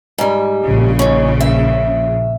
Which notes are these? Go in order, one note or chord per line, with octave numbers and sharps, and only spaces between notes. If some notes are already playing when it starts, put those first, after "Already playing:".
G#2 G3
A#1 C#3
D#3 C#4
E5